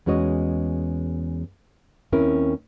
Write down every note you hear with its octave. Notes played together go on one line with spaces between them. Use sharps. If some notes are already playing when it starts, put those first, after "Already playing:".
E2 G#3 C#4 F#4 C#5 D#5
D#2 C4 C#4 E4 A#4